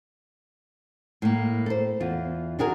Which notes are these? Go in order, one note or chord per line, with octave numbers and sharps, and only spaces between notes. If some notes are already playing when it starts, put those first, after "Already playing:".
A2 A#3
A4 C5
E2 F4
D4 F#4 G#4 A#4